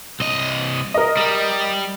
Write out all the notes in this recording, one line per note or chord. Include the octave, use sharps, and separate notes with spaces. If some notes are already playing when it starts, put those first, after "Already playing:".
C2 D#5
A#4 D#5
G3